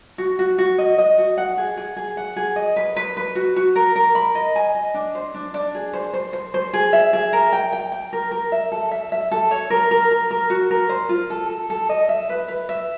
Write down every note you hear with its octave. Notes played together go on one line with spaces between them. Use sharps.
F#4
F#4
F#4
D#5
D#5
F#4
F#5
G#4
G#4
G#4
F#5
G#4
D#5
B4
B4
B4
F#4
F#4
A#4
A#4
B5
D#5
G#5
D#5
D4
C5
D4
D4
G#4
C5
C5
C5
C5
G#4
E5
G#4
A#4
G5
G5
G5
A#4
A#4
E5
A4
E5
E5
A4
C#5
A#4
A#4
A#4
A#4
F#4
A#4
C5
F4
A4
A4
A4
D#5
E5
B4
B4
E5